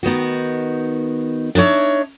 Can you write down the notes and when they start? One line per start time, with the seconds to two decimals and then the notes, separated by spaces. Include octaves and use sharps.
0.03 D#3 B3 D#4 F#4
1.55 D4 D#4 C5 C#5 E5